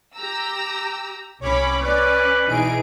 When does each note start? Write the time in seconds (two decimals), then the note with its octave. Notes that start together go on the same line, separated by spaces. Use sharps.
0.15 G4 A#5 E6
1.41 C2 C#4 C#5 B5 D6
1.82 C#4 B4 D5
2.47 B2 E3 D#4 G#4 D7